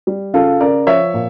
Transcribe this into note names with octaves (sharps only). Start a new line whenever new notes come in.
G3
C#3 F4 A4
C#3 A#4 D5
F3 C#5 E5
A#2